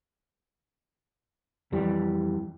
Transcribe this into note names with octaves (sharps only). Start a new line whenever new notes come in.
F2 E3 G3